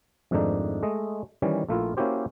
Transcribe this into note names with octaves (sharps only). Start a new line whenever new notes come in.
F2 G#2 D#3 A3 D4 D#4
G#3 A3 D#5
D#3 E3 G3 C#4
A#1 A3 A#3 E4 F4
A#3 C#4 E4 F#4 G4 C5